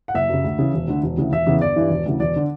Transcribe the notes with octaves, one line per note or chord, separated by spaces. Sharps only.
F#5
F#1 E5
F#2 C#3
D2
C#3 E3
E1
D2 D3
E1
D2 C#3 E3
E1 E5
E2 C#3 E3
G1 D5
G2 E3
E1
D2 C#3 E3
E1 D5
D3